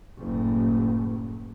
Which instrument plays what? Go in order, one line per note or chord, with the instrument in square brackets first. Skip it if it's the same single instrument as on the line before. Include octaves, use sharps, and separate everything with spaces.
[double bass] F#1 A2